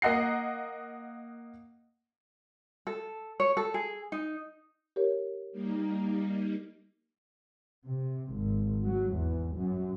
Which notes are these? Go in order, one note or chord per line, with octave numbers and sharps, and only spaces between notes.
A#3 D#5 F#5 C7
A4
C#5
A4
G#4
D#4
G4 A#4 C#5
G3 A#3 D#4
C3
G#1
F#3
E2
F#2